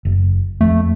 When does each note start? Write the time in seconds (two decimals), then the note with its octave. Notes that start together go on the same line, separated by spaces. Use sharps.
0.05 F#1
0.61 F2 A3